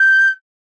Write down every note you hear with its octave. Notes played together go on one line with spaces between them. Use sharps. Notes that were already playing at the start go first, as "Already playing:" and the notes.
Already playing: G6